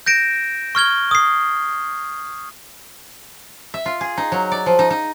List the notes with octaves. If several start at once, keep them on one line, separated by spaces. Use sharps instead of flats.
G6 A#6 D7 E7
C#6 F6 G#6 G7
D#6 C7
E5
F4
G#4
D#4
F#3
D5
F3
D#4
D#4